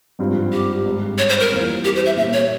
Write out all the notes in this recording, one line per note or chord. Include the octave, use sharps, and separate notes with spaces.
G#1 G2 F3 C4
G4
G#1 G#2 G3
C#5
C5
A#4
F2 E3 G3 A#3 F4
G4
C5
E5
A#2 G3 A#3 C#4 G4 E5
C#5